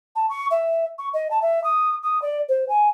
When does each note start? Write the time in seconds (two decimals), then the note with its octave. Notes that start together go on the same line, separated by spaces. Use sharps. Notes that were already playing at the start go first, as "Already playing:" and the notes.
0.16 A5
0.30 C#6
0.51 E5
0.98 C#6
1.14 D#5
1.31 A5
1.42 E5
1.64 D#6
2.03 D#6
2.22 D5
2.49 C5
2.69 G#5